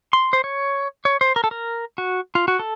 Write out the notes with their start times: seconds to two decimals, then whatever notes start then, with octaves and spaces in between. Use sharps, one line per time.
0.13 C6
0.33 C5
0.44 C#5
1.05 C#5
1.21 C5
1.36 A#4
1.44 A4
1.51 A#4
1.98 F#4
2.35 F4
2.48 F#4
2.59 A4